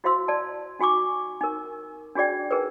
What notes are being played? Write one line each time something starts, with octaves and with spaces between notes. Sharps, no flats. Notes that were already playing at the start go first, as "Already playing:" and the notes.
E4 F#4 C5 F5 C6 E6
D5 A5
D#4 F#4 G#5 C#6 D6
D#4 A#4
D4 F#4 G#4 D5 G5
D#4 G#4 A#4 B4